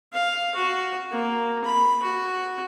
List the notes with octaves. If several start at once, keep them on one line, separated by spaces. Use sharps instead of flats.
F5
F#4
A#3
B5
F#4